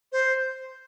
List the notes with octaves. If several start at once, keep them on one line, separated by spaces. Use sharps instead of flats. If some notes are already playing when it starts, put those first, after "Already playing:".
C5